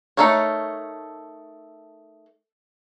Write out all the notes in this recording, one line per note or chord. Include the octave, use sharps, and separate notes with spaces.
A3 D#4 A4 A#4 C#5